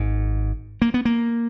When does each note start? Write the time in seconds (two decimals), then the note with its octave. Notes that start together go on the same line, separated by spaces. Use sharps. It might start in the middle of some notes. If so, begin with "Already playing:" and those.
Already playing: G#1 G#2
0.82 A#3
0.94 B3
1.05 A#3